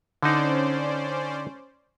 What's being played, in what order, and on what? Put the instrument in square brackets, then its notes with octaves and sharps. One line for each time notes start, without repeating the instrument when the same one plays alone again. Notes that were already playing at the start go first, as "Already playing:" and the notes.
[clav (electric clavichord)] D3 D#4 [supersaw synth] C#4 C5 D5